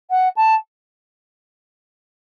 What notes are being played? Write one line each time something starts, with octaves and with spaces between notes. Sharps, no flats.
F#5
A5